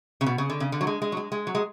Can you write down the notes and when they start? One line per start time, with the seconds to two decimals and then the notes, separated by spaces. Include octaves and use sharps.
0.21 C#3
0.26 B2
0.38 C#3
0.50 D3
0.60 C#3
0.72 D3
0.81 F#3
0.87 G#3
1.02 G#3
1.12 F#3
1.17 G#3
1.32 G#3
1.47 F#3
1.55 G#3